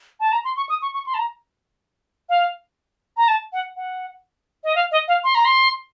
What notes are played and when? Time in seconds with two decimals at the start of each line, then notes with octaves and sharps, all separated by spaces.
0.20 A5
0.32 A#5
0.45 C6
0.57 C#6
0.69 D#6
0.82 C#6
0.94 C#6
1.07 C6
1.14 A5
1.18 A#5
2.29 F5
3.17 A#5
3.28 A5
3.53 F#5
3.76 F#5
4.64 D#5
4.75 F5
4.92 D#5
5.08 F5
5.24 C6
5.35 A#5
5.45 C6